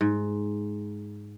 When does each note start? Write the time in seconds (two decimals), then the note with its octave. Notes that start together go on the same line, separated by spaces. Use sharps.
0.01 G#2